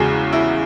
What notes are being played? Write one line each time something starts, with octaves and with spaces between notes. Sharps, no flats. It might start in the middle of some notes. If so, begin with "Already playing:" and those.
Already playing: E2 C#3 G#3 F#4
E4